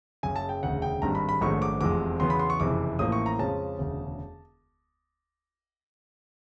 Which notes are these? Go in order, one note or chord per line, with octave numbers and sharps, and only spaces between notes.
F#1 F#2 C#3 G#5
A5
G5
E1 D2 C#3 F#5
G5
G#1 G2 D#3 G3 A#5
B5
B5
A#1 G#2 D#3 F#3 A3 C#6
D6
F1 E2 C3 F3 G#3 D6
E2 C#3 F#3 B3 C6
B5
C6
C#6
F#1 F2 C3 E3 D6
A1 A2 F3 A#3 D#6
C#6
A#5
F2 C#3 F3 G#3 C#4 A5
E1 D2 C#3